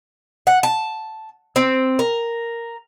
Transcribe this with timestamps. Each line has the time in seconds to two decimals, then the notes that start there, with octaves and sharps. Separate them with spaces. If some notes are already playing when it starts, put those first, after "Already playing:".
0.47 F#5
0.63 A5
1.56 C4
1.99 A#4